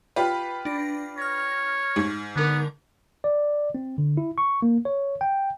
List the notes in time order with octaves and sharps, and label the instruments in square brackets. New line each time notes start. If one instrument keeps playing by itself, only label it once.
[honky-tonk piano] F4 G4 B4
[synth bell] D4 A#6
[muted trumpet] C#5 [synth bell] F6 A#6
[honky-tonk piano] G#2
[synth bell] D3 A#4 [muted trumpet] B3
[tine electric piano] D5
C4
D3
E4
C#6
A#3
C#5
G5